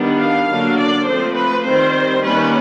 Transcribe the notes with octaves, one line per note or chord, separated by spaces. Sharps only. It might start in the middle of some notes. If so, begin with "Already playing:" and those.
Already playing: D#3 G3 B3 D4
F5
D3 F#3 A#3 D4
D5
F3 A3 C4 C5
B4
D#3 G3 C4 C5
D#3 G3 A#3 C#4 B4